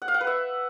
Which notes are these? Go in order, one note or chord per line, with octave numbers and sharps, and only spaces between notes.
F#5
F5
F#5
B4
E5